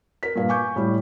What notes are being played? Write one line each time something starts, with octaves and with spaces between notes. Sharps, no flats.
A#4 B6
G2 A#2 F5
G#5 C#6 D6 G6
A2 G3